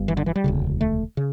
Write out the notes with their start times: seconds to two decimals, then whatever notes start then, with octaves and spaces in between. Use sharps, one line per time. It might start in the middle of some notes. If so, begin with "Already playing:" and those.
Already playing: G1 G2
0.08 E3
0.17 D3
0.26 E3
0.36 G3
0.44 E1 D2 C#3
0.81 A3
1.17 C#3